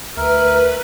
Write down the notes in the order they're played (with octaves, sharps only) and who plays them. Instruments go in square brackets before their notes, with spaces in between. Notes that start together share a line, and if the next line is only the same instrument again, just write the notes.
[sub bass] D2 [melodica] A#4 E5 [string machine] B4